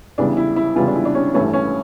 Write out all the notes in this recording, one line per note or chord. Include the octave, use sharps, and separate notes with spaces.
E2 C#3 E3 G3 D4
E4
E4
E2 C#3 E3 G3 F4
D4
E4
D4
C#4
A1 G2 E3 A3 C#4
C#4